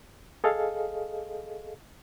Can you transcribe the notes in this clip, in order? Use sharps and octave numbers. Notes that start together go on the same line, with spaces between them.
G#4 A4 D#5 F5